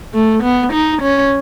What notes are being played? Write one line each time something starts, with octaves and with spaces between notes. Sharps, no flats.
A3
B3
D#4
C#4